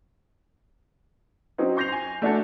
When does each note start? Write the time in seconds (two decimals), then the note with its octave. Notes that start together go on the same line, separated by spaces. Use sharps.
1.58 F#3 C4 C#4 D#4
1.76 C6 C#6 G6 A#6 C7 F7
1.92 G#5
2.22 A3 D4 F#4 A4